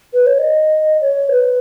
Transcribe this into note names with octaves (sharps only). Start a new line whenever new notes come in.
B4
C#5
D#5
C#5
B4